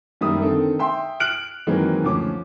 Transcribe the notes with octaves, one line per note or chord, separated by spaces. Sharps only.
F#2 D#3 G3 A#3 E5 D#6
D3 D#3 C4 A4
E5 G5 C6
F6 F#6 D7 F#7
D#3 E3 F#3 G#3 A#3 C4
D2 F3 C#4 D6